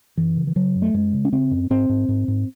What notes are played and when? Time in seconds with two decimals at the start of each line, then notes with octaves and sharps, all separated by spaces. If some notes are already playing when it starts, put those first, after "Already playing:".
0.17 F#2 E3
0.36 C#3
0.47 E3
0.56 C#3 F#3
0.75 F#2
0.82 A3
0.94 F#2 G#3
1.13 C#3
1.25 C#4
1.32 C#3 C4
1.51 F#2
1.70 G#2 C4
1.89 G#2
2.08 G#2
2.28 G#2